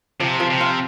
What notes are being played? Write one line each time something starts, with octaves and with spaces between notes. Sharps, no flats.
C3 F3
F3
C3
F4